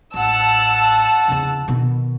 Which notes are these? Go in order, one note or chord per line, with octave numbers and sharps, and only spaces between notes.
A1 F#5 A5 E6
E2 C#3
B2 D#3